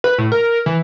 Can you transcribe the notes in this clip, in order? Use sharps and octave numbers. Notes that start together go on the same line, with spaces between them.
B4
A2
A#4
E3